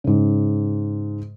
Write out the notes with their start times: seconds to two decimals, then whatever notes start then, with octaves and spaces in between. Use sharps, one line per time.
0.04 G#2 C#3